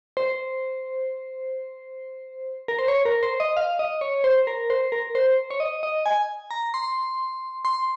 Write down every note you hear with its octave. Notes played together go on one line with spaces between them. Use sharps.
C5
A#4
C5
C#5
A#4
C5
D#5
F5
D#5
C#5
C5
A#4
C5
A#4
C5
C#5
D#5
D#5
G#5
A#5
C6
C6